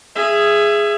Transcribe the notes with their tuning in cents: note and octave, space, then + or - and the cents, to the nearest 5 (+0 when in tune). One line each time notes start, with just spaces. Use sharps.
G#4 +0 E5 +25